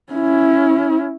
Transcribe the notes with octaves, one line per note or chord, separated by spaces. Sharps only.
C#4 E4